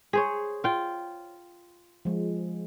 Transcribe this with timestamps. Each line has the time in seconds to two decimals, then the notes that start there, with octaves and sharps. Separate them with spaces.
0.13 G#4 C5 C#5
0.64 F4 G5
2.05 F3 G#3